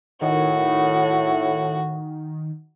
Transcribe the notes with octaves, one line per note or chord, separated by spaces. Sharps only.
A2 D#3 F#4